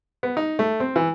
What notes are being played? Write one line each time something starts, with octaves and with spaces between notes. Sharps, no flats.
B3
D#4
A3
C4
E3